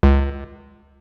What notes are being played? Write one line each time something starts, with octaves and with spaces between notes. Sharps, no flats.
C#2